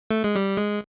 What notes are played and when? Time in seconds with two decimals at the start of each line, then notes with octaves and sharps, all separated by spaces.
0.11 A3
0.24 G#3
0.36 G3
0.57 G#3